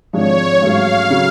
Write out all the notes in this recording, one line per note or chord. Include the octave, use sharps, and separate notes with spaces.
G#1 G#2 F3 G#3 D4 C#5
A1 G#2 F#3 A3 F5
C#3 F#3 C#4